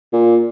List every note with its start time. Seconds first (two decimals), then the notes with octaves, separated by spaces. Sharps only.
0.13 A#2